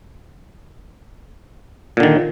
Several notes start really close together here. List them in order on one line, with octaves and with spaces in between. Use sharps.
A#2 D3 D#3